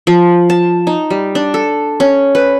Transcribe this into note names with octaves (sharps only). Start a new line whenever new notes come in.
F3
A5
D#4
G3
D4
A4
C#4
B4